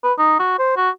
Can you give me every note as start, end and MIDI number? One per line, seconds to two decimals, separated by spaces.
0.03 0.13 71
0.19 0.36 63
0.39 0.55 66
0.59 0.77 72
0.77 0.89 66